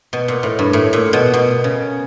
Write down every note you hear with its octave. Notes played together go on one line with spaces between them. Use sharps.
B2
A#2
A2
G2
A2
A#2
B2
B2
C#3